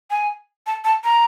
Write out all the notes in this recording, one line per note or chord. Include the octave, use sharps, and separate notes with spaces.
G#5
A5
A5
A#5